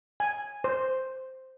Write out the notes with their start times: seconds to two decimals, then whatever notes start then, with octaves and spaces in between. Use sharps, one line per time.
0.20 G#5
0.64 C5